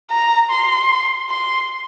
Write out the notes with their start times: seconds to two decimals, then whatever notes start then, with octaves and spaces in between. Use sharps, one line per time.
0.11 A#5
0.50 C6
1.29 C6